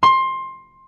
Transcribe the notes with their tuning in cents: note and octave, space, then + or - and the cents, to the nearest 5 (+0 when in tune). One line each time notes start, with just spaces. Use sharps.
C6 +20